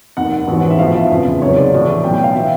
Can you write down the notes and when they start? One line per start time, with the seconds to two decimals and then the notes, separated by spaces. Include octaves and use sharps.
0.17 F1 D#2 D#3 F#5
0.48 A1 G#2 E3
0.70 E5
0.79 B1 A2 F3 F5
0.95 E5
1.10 F1 E2 C#3 F3
1.41 C#2 C3 D#3 F#3 C#5
1.56 D5
1.72 A1 A2 F3
2.03 B1 B2 F#3 G5
2.14 G5
2.24 F5
2.35 E3 E5